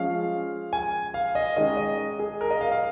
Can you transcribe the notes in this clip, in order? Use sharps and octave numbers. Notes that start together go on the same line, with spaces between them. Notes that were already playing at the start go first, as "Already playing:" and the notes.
Already playing: F3 G#3 C#4 F5
G#5
F5
D#5
D#3 G#3 C#4 D#5
D#5
G#4
A#4
D#5
F5
F5